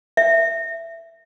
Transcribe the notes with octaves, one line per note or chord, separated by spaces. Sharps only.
E5